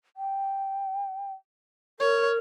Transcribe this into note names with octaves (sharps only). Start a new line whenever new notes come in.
G5
A#4 C#5